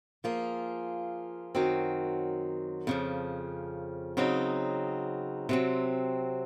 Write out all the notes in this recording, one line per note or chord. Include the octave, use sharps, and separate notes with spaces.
F3 A#3 F4 G#4
F#2 D#3 F#3 C4
F2 C#3 F3
C#3 F#3 C4 D#4
C3 F#3 C4